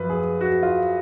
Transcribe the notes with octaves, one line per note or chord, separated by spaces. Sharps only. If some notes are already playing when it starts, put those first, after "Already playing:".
Already playing: F#2 F3 B4
G#4
F#4
F4